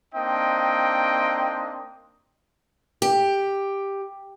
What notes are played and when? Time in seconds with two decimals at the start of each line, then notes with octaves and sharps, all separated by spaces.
0.14 A#3 C4 D4 D#4 D#5 G5
3.02 G4